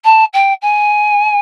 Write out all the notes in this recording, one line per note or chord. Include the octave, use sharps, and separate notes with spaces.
A5
G5
G#5